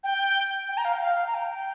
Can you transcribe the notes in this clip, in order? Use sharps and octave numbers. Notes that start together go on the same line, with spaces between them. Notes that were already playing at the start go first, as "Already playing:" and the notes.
G5
G5
A#5
F5
G5
F5
A#5
G5